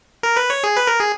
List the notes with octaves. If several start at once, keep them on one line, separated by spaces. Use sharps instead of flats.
A#4
B4
C#5
G#4
B4
A#4
G#4